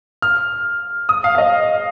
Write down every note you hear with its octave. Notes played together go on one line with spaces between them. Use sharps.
F6
D#6
F5
F5
D#5